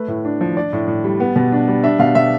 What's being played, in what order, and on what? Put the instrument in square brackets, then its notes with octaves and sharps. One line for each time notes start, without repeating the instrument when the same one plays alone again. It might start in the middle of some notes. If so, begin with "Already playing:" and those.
Already playing: [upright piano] A3 B4
A2
D4
F3
D4 D5
A2
A2
G3
B3
B2
D4
G3
D4 E5
B2 F5
B2 E5